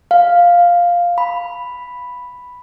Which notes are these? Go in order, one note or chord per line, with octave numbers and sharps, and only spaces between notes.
F5
B5